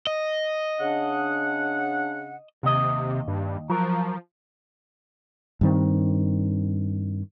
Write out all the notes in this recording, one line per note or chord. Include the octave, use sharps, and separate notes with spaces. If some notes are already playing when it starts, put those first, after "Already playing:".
D#5
C#3 D4 F#5
D#2 C3 D#5
G2
F3 F#3 A#4
G2 D#3 C4